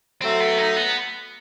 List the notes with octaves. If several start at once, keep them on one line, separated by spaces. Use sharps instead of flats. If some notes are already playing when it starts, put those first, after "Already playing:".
F#3 A3 C4
B3
D#4
B3